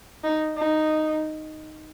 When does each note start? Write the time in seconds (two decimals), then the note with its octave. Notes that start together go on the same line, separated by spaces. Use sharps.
0.24 D#4
0.58 D#4